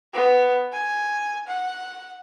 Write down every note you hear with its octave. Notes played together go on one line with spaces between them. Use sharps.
B3
G#5
F#5